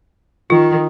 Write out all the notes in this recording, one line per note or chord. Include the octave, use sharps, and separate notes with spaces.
D#3 F4